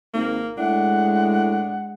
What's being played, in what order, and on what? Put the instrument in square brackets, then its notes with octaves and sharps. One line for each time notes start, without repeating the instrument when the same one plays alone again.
[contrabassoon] G#1 [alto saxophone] A#3
[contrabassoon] A2 [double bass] G#3 [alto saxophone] D4 [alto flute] F#5